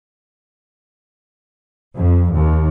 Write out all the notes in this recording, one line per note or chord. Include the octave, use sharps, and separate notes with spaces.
F2
D#2